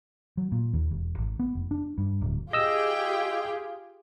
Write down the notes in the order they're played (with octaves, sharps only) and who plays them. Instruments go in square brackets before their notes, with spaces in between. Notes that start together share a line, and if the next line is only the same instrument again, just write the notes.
[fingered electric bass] F#3
A#2
D#2
E1
G#1
B3
F1
D4
G2
D1
[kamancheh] F4 [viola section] G4 G#4 [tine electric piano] D#5 E6 [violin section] G5